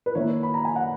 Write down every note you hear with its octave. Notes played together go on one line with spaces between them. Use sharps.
B4
D#3 A#3 E4 C#5
B5
A#5
G#5
F#5